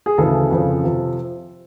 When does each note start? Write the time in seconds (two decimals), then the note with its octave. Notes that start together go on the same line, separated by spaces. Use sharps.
0.06 G#4
0.18 D2 C#3 E3 A4
0.51 F2 C#3 F3
0.84 C3 F3